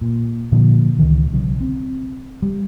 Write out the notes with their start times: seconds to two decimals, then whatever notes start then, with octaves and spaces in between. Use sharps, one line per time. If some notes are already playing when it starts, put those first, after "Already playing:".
0.01 A#2
0.52 A#2 D3 F3
0.98 C#2 C3 D#3 E3
1.32 B1 C#3 F#3
1.61 C4
2.42 G3